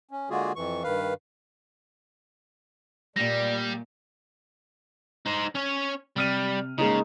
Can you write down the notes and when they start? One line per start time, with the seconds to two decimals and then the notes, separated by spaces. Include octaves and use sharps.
0.11 C#4
0.30 D3 G#3 A#3 F4 F#4 G#4
0.56 F2 E3 C#6
0.83 G2 D#3 B4 F5
3.16 A#2 G3 A3 D5 A#6
5.26 D#4 C5
5.55 C#4 C#5
6.16 C3 G3 F6 D#7
6.78 C#3 G#3 A#3 D#4